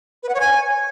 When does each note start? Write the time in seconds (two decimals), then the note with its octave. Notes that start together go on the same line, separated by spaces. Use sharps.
0.23 B4
0.29 F#5
0.34 C#5
0.40 G#5